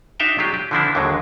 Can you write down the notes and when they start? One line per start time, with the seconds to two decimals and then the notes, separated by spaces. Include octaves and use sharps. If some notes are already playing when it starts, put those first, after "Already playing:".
0.20 D4 D#4 F#4 E5 F5 G5
0.39 F#3 D4 F4 G4 G#4
0.54 G4
0.71 D3 E3 F3 C4 D4 E4
0.95 D#2 D3 F#3 G#3